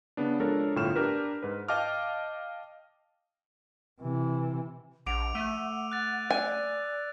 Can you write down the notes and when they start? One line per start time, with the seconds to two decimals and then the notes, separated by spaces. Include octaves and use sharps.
0.17 C#3 B3 D4
0.40 F3 G#3 D4 A4 A#4 C#5
0.76 G1 A2 F4 G5 F6 E7
0.96 D4 G4 A#4 B4
1.43 G#2 B4
1.68 D#5 F5 G5 A5 D6 F6
4.01 C3 E3
5.06 A#1 F#5 D6 D7 F7
5.35 A3 E6 D#7
5.92 F#6 A6
6.30 D5 G#5